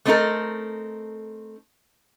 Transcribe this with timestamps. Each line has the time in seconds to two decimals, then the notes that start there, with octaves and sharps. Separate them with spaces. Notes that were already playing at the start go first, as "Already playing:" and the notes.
0.05 A3 C4 D4 D#4 A4 A#4